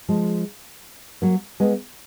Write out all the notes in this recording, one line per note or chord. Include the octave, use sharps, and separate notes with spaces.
F3 G#3
F#3 A#3
G#3 B3